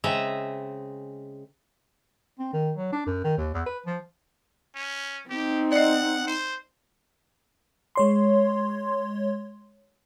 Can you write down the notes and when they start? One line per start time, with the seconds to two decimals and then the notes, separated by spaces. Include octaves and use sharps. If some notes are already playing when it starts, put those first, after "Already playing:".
0.04 C#3 G#3 C4 D#5 E5 A#5
2.39 C4
2.53 D#3
2.77 F#3
2.92 D4
3.06 F#2
3.24 D#3
3.38 D#2
3.54 E2
3.66 B4
3.86 F3
4.75 C#4
5.30 C4 D#4 G4
5.72 D5 D#5 F#5
6.27 C5
7.95 G#3 C#5 C6